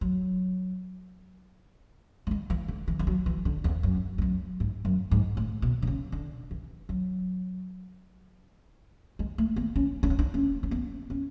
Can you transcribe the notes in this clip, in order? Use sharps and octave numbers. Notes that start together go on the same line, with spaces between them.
F#3
F#3
G#3
E3
D3
E3
E3
F#3
E3
D3
E2
F#2
E2
F#2
G#2
F#2
G#2
A2
B2
D3
C#3
D3
E3
F#3
G#3
A3
B3
C#4
D4
C#4
D4
C#4
C#4
B3
C#4